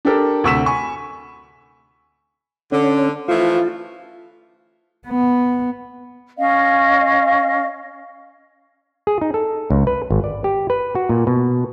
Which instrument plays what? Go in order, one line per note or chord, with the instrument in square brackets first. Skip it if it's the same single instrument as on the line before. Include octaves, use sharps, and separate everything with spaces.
[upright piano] D4 G4 A4 A#4
D2 C3 C#6 E6 B6 E7
G#5 B5 C#6
[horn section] D3 [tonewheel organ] C#4
[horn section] E3 F3 A3 [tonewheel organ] F4
[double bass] B3
[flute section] C#4 D#5 F5
[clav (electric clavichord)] G#4
D#4
A4
C#2
B4
G#1
D5
G4
B4
F#4
A#2
B2